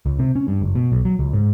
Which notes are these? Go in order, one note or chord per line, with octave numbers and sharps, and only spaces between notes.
C#2
C3
C#4
G2
F#1
B2
B1
F#3
C#2
G#2